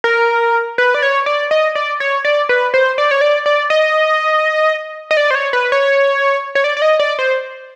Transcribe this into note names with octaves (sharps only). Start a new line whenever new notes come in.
A#4
B4
D5
C#5
D5
D#5
D5
C#5
D5
B4
C5
D5
C#5
D5
D5
D#5
D#5
D5
C5
C#5
B4
C#5
C#5
D5
D5
D#5
D5
C5